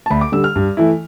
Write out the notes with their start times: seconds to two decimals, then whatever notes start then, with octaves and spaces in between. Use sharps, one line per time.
0.06 A5
0.10 D2 B5
0.21 D6
0.32 D3 G3 E6
0.44 F6
0.56 G2
0.77 E3 A3 E4